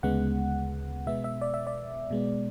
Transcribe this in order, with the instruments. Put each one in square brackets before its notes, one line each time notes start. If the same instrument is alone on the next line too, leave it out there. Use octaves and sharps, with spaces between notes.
[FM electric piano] D2 C#3 G#3 B3 F#5
B2 G#3 B3 E5
E5
D5
E5
D5
B2 G#3 B3